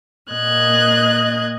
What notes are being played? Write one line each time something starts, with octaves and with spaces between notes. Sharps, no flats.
A#2 A#3 D#5 F#6 G#6